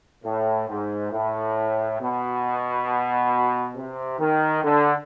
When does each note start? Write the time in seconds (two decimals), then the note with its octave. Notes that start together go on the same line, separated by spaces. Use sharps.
0.24 A2
0.69 G#2
1.12 A2
2.00 B2
3.75 C3
4.20 D#3
4.64 D3